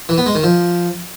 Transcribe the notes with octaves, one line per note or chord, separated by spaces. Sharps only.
E3
B3
G#3
D#3
F3